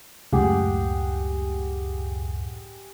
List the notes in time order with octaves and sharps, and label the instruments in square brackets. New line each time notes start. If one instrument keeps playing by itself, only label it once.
[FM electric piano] C#2 F#2 A2 [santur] G4 G#4 F#5